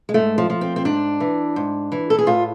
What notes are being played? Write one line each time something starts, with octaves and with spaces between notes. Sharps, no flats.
G#3
G#2 A3
F3
F3
C4
C4
G#2 D4
E3
G#2
E3
A4
G#4
A2 F4